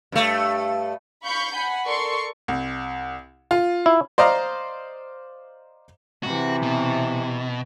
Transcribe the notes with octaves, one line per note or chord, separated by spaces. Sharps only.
G2 A3
F5 B5 C#6 G6
F#5 G#5 B5
A4 A#4 D5 C6 C#6
C2
F4
E4
C5 D5 D#5 F5 A#5
C3 E3 F#4
B2